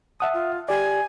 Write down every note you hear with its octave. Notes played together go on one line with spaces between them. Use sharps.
E5 F#5 A5 D#6
F4
G4 D5 G#5